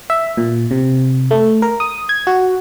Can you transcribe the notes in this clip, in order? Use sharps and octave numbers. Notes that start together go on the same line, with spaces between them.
E5
A#2
C3
A3
A#4
D#6
G#6
F#4